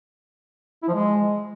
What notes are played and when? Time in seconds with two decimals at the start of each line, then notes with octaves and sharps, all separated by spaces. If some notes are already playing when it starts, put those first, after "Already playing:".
0.83 E4
0.88 F3
0.94 G#3